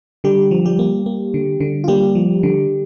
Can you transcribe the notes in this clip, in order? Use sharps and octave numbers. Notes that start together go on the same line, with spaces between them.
D3 G3 G4
F3
G3 G4
A#3
A#3
D3
D3
F4
G3 A#3 G4
F3
D3